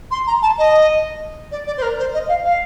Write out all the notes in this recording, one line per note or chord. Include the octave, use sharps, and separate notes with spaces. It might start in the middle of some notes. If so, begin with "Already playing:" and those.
C6
A#5
A5
D#5
D5
D5
C5
A#4
C5
D#5
F5
F5